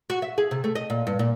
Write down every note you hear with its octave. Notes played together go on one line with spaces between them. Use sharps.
F#4
E5
G#4
C3
A3
D#5
A#2
G2
A#2